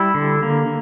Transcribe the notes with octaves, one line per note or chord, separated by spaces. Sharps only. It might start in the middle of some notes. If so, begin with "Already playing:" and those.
Already playing: G3 E4
D3
A#3